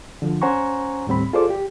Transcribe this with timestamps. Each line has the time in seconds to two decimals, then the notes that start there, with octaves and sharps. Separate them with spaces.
0.22 D3 F3
0.42 C#4 C5 F#5 G#5 A#5 C#6
1.07 D#2 A2 G3 C4 B5
1.33 F4 G#4 A4 C5 D5 D6
1.50 G4